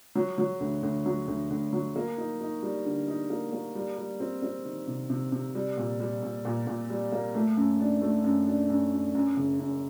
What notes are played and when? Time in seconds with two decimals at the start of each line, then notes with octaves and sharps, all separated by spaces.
0.15 F#3
0.38 F#3
0.60 D2
0.83 D2
1.06 F#3
1.28 D2
1.50 D2
1.73 F#3
1.96 A#3
2.18 D#4
2.41 D#4
2.63 G3
2.85 D3
3.07 D#4
3.30 A#3
3.53 A#3
3.75 G3
3.98 G3
4.20 C4
4.42 C4
4.65 D#3
4.87 C3
5.10 C3
5.32 C3
5.55 G3
5.77 A#2
6.00 G3
6.23 A#2
6.45 A#2
6.67 A#2
6.90 G3
7.12 A#3
7.35 A3
7.57 F#2
7.80 D4
8.02 A3
8.24 F#2
8.47 D4
8.70 F#2
8.92 D4
9.15 F#2
9.37 F#1
9.60 F#2